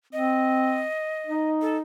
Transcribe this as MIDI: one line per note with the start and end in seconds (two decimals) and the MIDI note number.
0.13 0.85 60
0.13 1.50 75
1.27 1.82 63
1.62 1.76 69